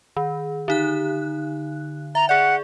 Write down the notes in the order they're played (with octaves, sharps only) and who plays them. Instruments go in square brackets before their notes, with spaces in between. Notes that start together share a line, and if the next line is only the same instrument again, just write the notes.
[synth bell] D#3
D3 D#4 F#6
[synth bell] E5 [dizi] A#5
[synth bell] G#4 D5 [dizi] F#5